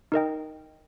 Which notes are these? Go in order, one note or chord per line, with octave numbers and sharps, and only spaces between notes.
D#4 A#4 D#5 G5